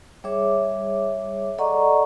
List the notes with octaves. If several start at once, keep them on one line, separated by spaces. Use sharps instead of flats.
G3 G#4 C#5 E5 D6
A4 D5 D#5 F#5 A#5 C#6